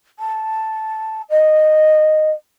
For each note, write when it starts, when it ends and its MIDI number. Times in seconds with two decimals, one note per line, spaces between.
0.19 1.22 81
1.30 2.31 75